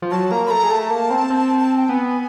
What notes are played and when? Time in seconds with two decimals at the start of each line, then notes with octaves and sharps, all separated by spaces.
0.02 F3
0.11 F#3 A5
0.31 A#3 A#5
0.46 B5
0.50 A3 A#5
0.64 G#3
0.70 A3 A5
0.91 A#3
1.10 C4
1.30 C4
1.78 G5
1.89 B3 G#5